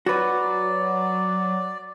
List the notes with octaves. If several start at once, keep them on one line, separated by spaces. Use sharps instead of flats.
F#3 F#4 B4 D5